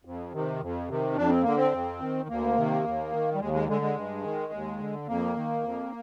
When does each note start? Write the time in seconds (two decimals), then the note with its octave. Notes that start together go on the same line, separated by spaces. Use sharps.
0.05 F2
0.33 C3 D#3
0.61 F2
0.88 C3 D#3
1.16 F2 D4
1.29 C4
1.43 D3 A#3
1.56 C4
1.72 F2
2.00 D#3
2.29 D2 A#3
2.57 C3 D#3
2.84 D#2
3.12 D#3
3.35 G3
3.40 D#2 G#3
3.54 G#3
3.68 D3 G#3
3.82 G#3
3.96 G2
4.24 D#3
4.53 D#2
4.79 D3
5.08 F2 A#3
5.36 D#3
5.64 F2